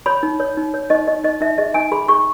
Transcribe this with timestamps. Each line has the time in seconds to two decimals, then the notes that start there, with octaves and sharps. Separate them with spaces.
0.06 C#5 B5
0.23 D#4
0.40 C#5
0.57 D#4
0.74 C#5
0.90 D#4 D#5
1.07 D#4 D#5
1.24 D#4 D#5
1.41 D#4 E5
1.58 G#4 D#5
1.74 D#4 G#5
1.92 G#4 B5
2.08 G#4 C#6